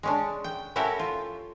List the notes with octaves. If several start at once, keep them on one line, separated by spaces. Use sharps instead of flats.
G#3 C#4 D4
G5
C#4 E4 F#4 G4 A4 A#4
F4